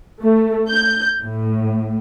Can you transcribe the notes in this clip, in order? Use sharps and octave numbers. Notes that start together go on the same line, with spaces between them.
A3
G6
A2